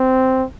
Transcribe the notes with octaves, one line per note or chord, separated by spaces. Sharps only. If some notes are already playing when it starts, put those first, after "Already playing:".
Already playing: C4